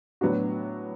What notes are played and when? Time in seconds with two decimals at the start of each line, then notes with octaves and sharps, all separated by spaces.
0.21 A2 F#3 B3 D4 F#4